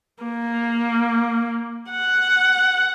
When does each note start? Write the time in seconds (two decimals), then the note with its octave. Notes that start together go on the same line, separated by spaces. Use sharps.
0.24 A#3
1.91 F#5